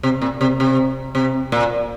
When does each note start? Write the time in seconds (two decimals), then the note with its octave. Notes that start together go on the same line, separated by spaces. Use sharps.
0.03 C3
0.22 A#2
0.41 C3
0.60 C3
1.15 C3
1.52 A#2